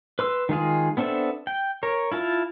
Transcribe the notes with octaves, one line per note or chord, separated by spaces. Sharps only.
B4 C6 E6
D#3 G#3 F4 G#4
B3 C4 D4 A4 E5
G5
A#4 C#5
E4 F4 A5